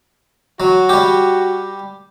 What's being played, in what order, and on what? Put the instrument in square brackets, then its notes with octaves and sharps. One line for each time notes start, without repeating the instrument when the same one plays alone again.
[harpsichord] F#3 [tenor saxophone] F#4
[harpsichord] G3 G4